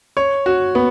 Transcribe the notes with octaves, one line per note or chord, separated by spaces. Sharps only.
C#5
F#4
B3